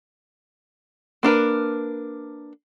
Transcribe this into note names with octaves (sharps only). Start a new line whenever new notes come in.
A#3 D4 A#4 B4